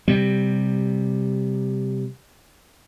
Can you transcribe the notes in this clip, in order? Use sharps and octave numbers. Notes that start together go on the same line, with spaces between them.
C3 G3